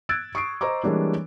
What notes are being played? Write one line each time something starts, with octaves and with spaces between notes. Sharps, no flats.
E6 F#6 G#6 A6 D7
C#6 D#6 C7 D7
C5 D#5 A#5 C#6 D6
E3 G3 G#3 A#3 D4 C#5